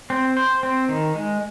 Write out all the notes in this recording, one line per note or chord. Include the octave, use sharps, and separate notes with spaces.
C4
C5
C4
D#3
G#3